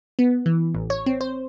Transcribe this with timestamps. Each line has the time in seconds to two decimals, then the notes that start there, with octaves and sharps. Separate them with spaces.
0.19 B3
0.46 E3
0.75 A1
0.90 C#5
1.06 C4
1.21 C5